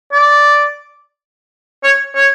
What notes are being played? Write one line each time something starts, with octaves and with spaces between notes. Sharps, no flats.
D5
C#5
C#5